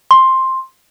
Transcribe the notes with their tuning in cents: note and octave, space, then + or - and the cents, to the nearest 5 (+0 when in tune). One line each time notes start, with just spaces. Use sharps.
C6 +10